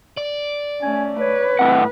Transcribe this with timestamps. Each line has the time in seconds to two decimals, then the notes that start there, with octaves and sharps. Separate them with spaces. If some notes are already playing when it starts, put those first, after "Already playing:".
0.17 D5
0.82 A3 C#4 G#5
1.20 B4 C#5
1.59 A2 C4 F#5